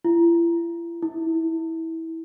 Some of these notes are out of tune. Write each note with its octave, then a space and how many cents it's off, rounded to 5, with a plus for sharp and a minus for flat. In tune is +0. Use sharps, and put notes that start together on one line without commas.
E4 +40
E4 -20